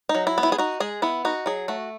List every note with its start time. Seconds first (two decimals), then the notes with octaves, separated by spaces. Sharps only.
0.09 D#4
0.15 F#3
0.27 E4
0.38 B3
0.43 E4
0.52 G#4
0.58 D#4 F#4
0.80 G#3 G#4
1.02 B3 E4
1.25 D#4 F#4
1.46 F#3 G#4
1.68 A3 F#4